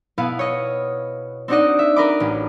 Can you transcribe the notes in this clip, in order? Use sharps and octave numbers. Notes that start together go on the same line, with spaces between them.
B2 B3 E4 B4 F5
C#5 D#5
C4 D4 D#4 F#4 D5 D#5
E5
A#4 B4 D#5 A#5 B5 D6
A1 C#4